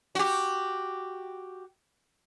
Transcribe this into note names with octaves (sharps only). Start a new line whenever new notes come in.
F#4 G4